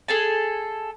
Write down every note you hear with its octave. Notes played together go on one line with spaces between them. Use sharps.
G#4 A4 A5